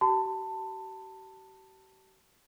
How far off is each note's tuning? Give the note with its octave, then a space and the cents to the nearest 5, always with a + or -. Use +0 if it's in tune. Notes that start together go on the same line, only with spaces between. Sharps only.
G4 -45 A5 +15 C6 -45